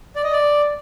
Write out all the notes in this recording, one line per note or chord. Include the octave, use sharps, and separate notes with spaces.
D5
D#5
D5